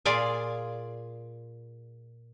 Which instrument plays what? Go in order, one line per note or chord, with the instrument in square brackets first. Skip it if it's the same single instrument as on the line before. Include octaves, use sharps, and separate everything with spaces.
[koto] A#2 F4 G#4 D5 G#5